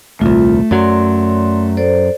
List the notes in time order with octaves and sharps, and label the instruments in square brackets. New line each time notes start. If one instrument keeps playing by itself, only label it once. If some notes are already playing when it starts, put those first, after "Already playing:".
[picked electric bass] D#1 C2 [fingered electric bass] A3 [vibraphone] F4
[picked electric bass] F#2 F#3 [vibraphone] D5 C6
[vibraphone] A4 C5 D5